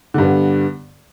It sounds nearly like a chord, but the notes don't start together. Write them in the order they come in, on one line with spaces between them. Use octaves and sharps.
D3 G2 B3